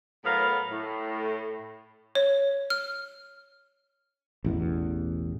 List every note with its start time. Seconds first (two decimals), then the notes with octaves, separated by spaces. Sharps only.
0.24 A2 F#3 B3 A#4 F5
0.70 A2
2.15 C#5
2.70 F6
4.44 A1 E2 B2